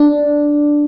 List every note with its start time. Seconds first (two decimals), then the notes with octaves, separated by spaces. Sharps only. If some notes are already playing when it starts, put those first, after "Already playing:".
Already playing: D4